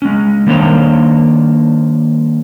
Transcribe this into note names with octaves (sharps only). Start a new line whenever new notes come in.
G#3 C#4
D#3 G3 A#3 D4 C5 C#5